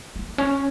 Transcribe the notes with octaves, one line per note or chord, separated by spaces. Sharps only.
A#3
C#4